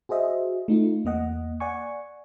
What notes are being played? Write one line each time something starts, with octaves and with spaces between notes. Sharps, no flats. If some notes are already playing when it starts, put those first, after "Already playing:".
F#4 G#4 C5 D#5 E5
A3 D#4 F4
E2 A#3 D#5 F#5
D5 F#5 G#5 C#6